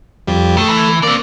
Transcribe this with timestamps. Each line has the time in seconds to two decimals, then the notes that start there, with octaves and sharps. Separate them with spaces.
0.28 F2 G3
0.57 D#3 A3
0.69 E3
1.03 A#3 C4 D5